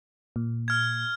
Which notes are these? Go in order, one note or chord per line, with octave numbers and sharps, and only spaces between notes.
A#2
F6 G#6